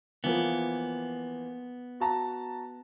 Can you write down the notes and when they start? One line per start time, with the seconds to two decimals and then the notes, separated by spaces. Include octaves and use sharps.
0.24 E3 F3 A#3 B3
2.00 F#4 A5 A#5